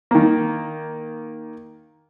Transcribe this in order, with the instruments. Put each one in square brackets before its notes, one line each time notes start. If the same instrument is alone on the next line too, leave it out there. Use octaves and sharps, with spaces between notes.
[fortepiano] D#3 A#3